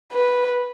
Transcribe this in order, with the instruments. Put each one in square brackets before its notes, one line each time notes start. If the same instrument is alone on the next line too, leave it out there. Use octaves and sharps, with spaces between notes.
[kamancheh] B4